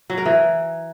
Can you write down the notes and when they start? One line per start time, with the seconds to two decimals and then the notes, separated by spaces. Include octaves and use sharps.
0.10 F#3
0.18 A#4
0.26 E3